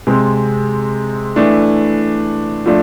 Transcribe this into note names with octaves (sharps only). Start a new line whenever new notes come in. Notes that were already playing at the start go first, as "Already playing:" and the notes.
C3 G#3 C4
E3 A3 D4
F3 A3 D4